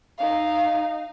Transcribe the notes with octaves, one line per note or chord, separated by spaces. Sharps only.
D#4 F5